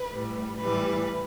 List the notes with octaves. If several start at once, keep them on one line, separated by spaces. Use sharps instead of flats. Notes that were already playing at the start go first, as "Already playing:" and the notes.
Already playing: B4
A2 G3
A2 E3 G3 B4